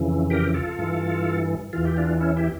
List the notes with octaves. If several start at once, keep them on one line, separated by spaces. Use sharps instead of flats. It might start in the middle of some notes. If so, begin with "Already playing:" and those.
Already playing: F2 C#3 E3
G4 A#4
F4 A4
G2 E3
E2 E3 F4
G4
D4 F4
C#4 E4
E4 G4